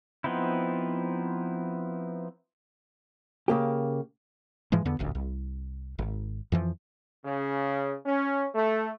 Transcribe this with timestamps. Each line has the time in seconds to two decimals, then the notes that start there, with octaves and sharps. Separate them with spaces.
0.24 F3 B3 C4 D#4 E4
3.48 C#3 A#3 G4
4.72 G#2 E3 F3 G#3
4.85 E2 D3 B3
4.99 D#1 A1 D2
5.15 C2
5.99 G#1
6.52 F2 E3 F3
7.24 C#3
8.05 C#4
8.55 A3